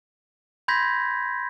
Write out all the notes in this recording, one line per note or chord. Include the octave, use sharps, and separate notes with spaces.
B5 C6 G6 G#6 A#6 B6